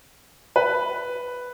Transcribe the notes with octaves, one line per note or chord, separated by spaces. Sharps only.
B4